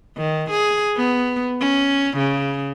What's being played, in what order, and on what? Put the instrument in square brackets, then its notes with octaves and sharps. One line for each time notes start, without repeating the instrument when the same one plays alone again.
[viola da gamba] D#3
G#4
B3
C#4
C#3